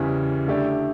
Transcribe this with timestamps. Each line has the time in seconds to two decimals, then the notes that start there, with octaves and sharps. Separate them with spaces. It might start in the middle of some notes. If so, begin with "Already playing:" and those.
Already playing: E2 C#3 E3 G3
0.47 D3 A3 E4 G4 D5